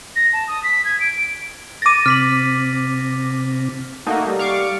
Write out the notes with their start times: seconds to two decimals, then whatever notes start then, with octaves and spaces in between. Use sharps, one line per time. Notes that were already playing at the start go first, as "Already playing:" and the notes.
0.16 A#6
0.33 A5
0.48 D#6
0.64 B6
0.85 G#6
1.00 D7
1.82 D6 A6 A#6 D#7
2.06 C3 F6 B6 F#7
4.07 A3 A#3 D#4 F#4
4.24 G3
4.39 F5 C#6 D6